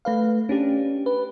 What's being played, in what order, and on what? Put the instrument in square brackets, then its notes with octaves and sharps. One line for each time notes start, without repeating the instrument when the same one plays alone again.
[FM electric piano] A3 B4 F5
C#4 D4 G4
B4